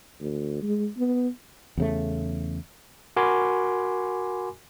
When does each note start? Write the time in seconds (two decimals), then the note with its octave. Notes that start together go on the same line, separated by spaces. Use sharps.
0.20 D2
0.62 G#3
0.97 B3
1.77 E2 C#3 A3
3.16 F#4 A#4 G#5 B5 C6 D6